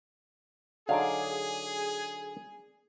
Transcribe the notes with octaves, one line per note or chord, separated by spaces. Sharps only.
D3 F#3 D#4 G#4 D5 F5